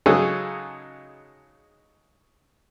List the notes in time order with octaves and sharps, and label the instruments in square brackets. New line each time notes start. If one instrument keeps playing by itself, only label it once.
[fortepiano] C#3 F#3 G#3 D#4 G#4 A4